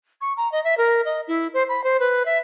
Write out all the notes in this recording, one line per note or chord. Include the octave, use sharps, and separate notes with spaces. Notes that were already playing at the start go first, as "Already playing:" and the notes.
C#6
A#5
D#5
E5
A#4
D#5
E4
C5
B5
C5
B4
E5